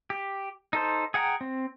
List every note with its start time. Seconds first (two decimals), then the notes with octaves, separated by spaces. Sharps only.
0.10 G4
0.73 D#4 A4 C5
1.14 G#4 F#5 G5 A#5
1.41 C4